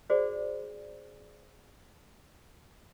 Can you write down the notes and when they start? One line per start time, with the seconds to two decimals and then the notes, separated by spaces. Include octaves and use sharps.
0.10 F#4 G#4 C5 D5